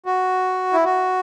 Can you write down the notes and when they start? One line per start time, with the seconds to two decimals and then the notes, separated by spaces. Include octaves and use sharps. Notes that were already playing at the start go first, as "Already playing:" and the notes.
0.06 F#4
0.73 E4
0.85 F#4